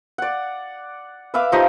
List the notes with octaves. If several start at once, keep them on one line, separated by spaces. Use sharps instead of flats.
D5 F#5
B4 E5 F5 D6
F3 D#4 G4 D#5